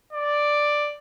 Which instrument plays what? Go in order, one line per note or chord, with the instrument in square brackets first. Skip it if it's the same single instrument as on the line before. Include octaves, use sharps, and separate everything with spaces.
[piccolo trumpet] D5